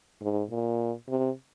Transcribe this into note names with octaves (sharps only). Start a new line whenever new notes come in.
G#2
A#2
C3